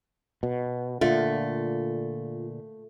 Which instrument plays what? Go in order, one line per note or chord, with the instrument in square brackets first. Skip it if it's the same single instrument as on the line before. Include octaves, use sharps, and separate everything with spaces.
[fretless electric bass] B2
[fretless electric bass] A#2 D3 [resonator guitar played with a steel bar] A3 [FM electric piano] F4